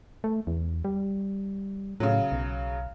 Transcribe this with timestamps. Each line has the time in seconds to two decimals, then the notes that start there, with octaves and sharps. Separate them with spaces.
0.24 A3
0.47 E2
0.85 G3
2.00 A2 C#3 F#3
2.32 B1